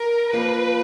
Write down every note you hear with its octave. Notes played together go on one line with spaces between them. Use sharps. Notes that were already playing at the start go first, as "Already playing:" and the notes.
Already playing: A#4
F2 F3 A#3 F4 B4